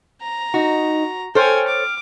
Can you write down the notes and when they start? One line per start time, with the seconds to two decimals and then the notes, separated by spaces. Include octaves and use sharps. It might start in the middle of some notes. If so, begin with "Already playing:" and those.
0.23 A#5
0.54 D#4 F#4
1.35 A4 C5 C#5 G5 G#5 F6
1.68 D6